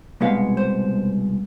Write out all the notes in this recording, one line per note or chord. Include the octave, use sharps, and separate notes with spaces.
C2 B2 G#3 B3 F5
C5